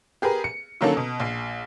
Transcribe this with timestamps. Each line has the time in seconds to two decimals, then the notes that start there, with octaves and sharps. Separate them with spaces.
0.22 G4 G#4 A#4 B4
0.44 C#7
0.81 D3 D#3 F#3 A#3 C#4 A4
0.97 B2
1.20 A#1 C7